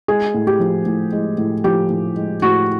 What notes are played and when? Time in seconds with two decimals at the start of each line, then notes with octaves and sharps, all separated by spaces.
0.08 G#3 G#4
0.34 A2
0.47 G4
0.60 F3
0.86 A2
1.12 G#3
1.38 A2
1.64 F3 G4
1.90 A2
2.16 G#3
2.42 A2 F#4